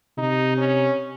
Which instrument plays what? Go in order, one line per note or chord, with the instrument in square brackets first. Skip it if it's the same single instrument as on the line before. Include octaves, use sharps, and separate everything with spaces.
[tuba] C3 [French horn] D#4
[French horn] C#4